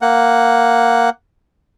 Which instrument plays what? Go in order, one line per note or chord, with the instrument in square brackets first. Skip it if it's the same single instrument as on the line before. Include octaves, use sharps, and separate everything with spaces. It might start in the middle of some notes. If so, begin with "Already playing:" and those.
[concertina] A#3 F#5